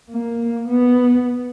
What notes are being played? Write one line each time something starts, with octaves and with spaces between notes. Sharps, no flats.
A#3
B3